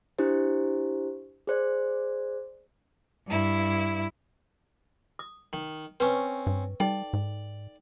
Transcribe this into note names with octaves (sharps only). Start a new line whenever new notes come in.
D4 E4 G4 C5
G#4 C5 D5
G2 E4
D#6
D#3
C4 C#4 B4 C#6
G2
G3 D#4 A4 D5 G5
G#2